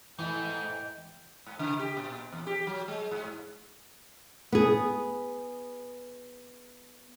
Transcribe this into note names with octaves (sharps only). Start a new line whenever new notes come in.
G#2 E3 A3 D#4 E4 D#5 G5
G#2
C#3
G4
A#2
E2
G4
F#3
G#3
G#2
B3 G#4